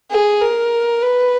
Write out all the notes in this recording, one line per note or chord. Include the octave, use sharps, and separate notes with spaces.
G#4
A#4
B4